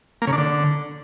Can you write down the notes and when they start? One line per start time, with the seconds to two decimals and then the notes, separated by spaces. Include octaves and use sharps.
0.22 A#3
0.27 C#3
0.33 D4
0.38 D3